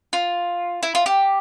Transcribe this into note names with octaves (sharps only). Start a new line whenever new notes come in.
F4
E4
F4
G4